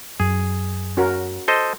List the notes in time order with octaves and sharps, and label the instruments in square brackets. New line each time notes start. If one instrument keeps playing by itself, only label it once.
[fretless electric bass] F#2 [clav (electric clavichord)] G#4
[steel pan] C#4 F#4 A#4
[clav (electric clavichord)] A4 C5 D#5